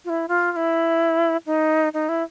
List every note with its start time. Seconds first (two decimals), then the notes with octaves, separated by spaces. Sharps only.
0.05 F4
0.09 E4
0.28 F4
0.52 F4
0.56 E4
1.46 D#4
1.94 D#4
2.09 E4